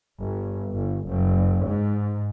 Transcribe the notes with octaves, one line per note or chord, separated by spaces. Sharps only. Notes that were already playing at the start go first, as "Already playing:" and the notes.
G1
G1
F#1
G#2